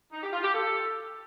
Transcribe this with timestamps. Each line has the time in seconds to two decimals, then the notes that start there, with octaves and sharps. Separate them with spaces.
0.12 D#4
0.23 G4
0.33 F4
0.43 G4
0.54 A4